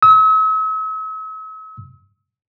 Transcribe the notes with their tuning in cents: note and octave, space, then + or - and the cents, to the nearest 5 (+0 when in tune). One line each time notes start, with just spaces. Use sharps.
E6 -45